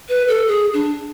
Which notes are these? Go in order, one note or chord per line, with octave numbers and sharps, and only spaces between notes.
B4
A4
G#4
D4